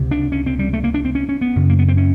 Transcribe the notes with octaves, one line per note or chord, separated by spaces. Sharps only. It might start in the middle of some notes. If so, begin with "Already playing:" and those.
Already playing: C#2 C3
D4
C#4
C4
G3
A3
A#3
D4
C4
C#4
C#4
B3
F#2 C#3
A#3
B3
C4
C#4